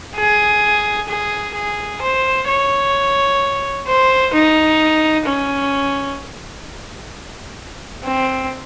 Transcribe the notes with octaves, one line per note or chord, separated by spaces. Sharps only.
G#4
G#4
G#4
C5
C#5
C5
D#4
C#4
C4